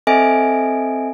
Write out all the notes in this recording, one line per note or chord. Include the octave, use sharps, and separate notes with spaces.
C4 A4 D#5 E5 G#5 D7